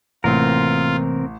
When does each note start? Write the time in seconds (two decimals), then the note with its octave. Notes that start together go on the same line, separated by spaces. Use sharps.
0.24 A1 C3 E3 A#3 C4 F4 A#4